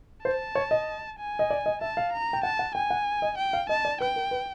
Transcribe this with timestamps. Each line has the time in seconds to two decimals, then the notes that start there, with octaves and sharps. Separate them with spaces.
0.25 C5 A5
0.55 C#5
0.71 D#5
1.19 G#5
1.39 D#5
1.50 D5
1.66 D#5
1.81 E5 A5
1.97 F5
2.13 A#5
2.33 G5
2.43 F#5 A5
2.59 F#5
2.75 G5 G#5
2.90 F#5
3.22 D#5
3.38 G5
3.53 F5
3.69 D#5 A5
3.85 D5
4.01 B4 G5
4.16 A#4
4.31 B4